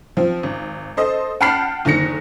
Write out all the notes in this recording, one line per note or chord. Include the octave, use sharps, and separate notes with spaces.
F3 C4
G#1
A4 C5 D#5
F#5 G5 A5 B5 F6 C7
F#1 D3 D#3 A#6 C#7